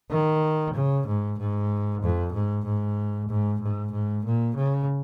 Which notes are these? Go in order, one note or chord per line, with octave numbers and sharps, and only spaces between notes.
D#3
C#3
G#2
G#2
F2
G#2
G#2
G#2
G#2
G#2
A#2
C#3